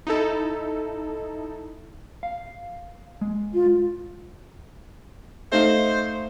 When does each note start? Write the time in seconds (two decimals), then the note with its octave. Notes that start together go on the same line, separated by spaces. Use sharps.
0.07 D#4 E4 A4
2.23 F5
3.21 G#3
3.54 F4
5.52 A3 D#4 C5 F5